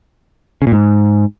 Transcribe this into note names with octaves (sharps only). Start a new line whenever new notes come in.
C#3
A#2
G#2